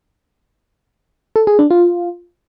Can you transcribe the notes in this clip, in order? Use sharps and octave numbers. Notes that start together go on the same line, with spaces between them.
A4
G#4
D4
F4